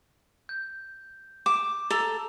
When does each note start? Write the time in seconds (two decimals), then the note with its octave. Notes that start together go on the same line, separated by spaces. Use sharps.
0.49 G6
1.46 D6 E7
1.91 A4 A#5 F7